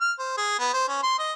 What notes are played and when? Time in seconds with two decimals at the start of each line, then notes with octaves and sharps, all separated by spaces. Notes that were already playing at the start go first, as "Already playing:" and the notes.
0.01 F6
0.19 C5
0.37 G#4
0.59 B3
0.74 C5
0.88 C#4
1.03 C6
1.19 D#5